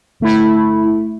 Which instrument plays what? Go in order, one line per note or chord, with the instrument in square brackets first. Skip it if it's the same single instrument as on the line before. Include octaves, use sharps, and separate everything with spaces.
[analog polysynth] G1 A3 E4